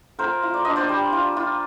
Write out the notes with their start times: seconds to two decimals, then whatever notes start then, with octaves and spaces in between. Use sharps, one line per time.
0.19 F4 A#4 C5
0.43 F4
0.54 D5
0.65 D4 D#5
0.76 C5 D5
0.89 G3
1.12 F4
1.36 F4